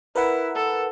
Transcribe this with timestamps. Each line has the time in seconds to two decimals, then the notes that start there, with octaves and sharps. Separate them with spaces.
0.15 E4 A#4 B4 F#5
0.55 A4